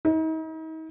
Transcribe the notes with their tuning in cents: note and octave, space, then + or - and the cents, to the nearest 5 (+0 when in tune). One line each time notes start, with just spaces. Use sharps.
D#4 +40